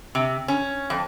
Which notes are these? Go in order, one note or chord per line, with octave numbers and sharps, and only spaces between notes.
C3
C#4
F2